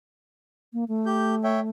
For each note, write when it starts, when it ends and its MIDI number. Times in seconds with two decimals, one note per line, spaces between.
0.73 0.84 58
0.88 1.70 57
1.06 1.35 67
1.06 1.35 91
1.44 1.60 73
1.44 1.60 76
1.44 1.60 79